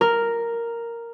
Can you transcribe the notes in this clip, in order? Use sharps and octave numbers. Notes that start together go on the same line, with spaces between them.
A#4